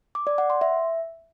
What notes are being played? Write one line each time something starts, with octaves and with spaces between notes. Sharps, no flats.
D6
D5
F#5
C6
E5